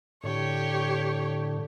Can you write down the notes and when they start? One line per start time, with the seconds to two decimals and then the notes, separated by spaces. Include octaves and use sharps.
0.24 A2 D3 G4 C#5